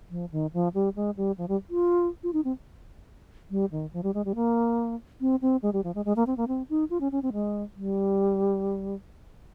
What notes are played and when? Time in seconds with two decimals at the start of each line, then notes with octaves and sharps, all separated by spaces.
0.10 F3
0.32 D#3
0.53 F3
0.74 G3
0.96 G#3
1.17 G3
1.38 F3
1.48 G3
1.70 F4
2.23 F4
2.33 D#4
2.44 C4
3.50 G3
3.71 D#3
3.93 F3
4.03 G3
4.14 G#3
4.25 G3
4.35 A#3
5.21 C4
5.42 C4
5.62 G#3
5.73 G3
5.84 F3
5.95 G#3
6.05 G#3
6.16 A#3
6.26 C4
6.37 A#3
6.48 C4
6.69 D#4
6.90 F4
7.01 C#4
7.12 C#4
7.22 C4
7.33 G#3
7.76 G3